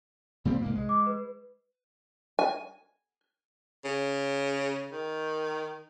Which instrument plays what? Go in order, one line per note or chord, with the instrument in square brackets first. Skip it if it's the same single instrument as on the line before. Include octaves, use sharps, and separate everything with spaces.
[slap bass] A#2 G3 C4
C2 G#2 A#3
G#3
[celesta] D6
B4
[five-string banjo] G#5
[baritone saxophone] C#3
D#3